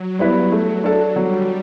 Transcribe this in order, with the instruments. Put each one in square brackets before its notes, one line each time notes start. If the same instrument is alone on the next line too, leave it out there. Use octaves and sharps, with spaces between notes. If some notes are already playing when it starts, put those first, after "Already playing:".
Already playing: [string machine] F#3
[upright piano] G3 B3 E4 B4
A3
D4 A4
[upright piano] F#3 [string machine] G3